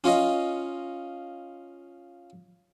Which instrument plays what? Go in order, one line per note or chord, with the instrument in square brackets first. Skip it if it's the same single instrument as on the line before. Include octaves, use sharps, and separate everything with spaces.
[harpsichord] C#4 F4 C#5 D#5